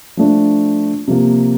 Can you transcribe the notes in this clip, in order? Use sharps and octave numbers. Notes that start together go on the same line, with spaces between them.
F3 A3 D4
C3 F3 A#3